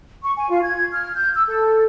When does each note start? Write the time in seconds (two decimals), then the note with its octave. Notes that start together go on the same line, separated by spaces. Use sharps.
0.24 C#6
0.37 G#5
0.50 F4
0.63 G#6
0.92 F6
1.15 G6
1.35 E6
1.48 A4